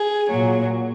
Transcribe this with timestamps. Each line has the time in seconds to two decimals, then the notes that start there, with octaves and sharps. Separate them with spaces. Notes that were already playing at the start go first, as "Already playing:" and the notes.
Already playing: G#4
0.30 A#2 F#3